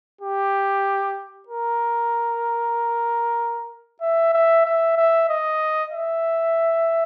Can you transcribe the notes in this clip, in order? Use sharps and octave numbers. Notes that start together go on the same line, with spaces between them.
G4
A#4
E5
E5
E5
E5
D#5
E5